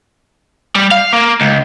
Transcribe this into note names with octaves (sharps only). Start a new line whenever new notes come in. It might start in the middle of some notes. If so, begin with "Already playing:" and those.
G3
F5
A#3
C#2